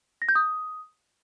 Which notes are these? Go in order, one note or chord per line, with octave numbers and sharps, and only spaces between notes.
A#6
G6
D#6